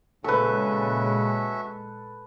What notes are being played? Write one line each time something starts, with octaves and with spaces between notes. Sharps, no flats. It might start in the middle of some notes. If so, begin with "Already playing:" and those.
A#1 C#3 G#3 C#4 F#4 A4 B4 E5